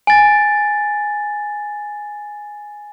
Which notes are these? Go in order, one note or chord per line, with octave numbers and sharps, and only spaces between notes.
G#5 A6